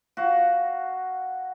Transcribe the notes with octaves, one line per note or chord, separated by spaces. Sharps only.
F#4 F5